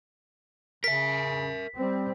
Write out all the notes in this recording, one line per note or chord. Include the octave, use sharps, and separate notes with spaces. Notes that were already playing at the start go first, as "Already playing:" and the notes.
C#3 A#4 E5 B6
G3 C4